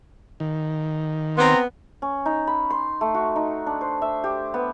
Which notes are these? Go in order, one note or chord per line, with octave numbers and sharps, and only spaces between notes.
D#3
B3 C4 A#5 C6
C#4
D#4
B5
C6
A3
F#4
D#4
D4
C5
E5
G4
B3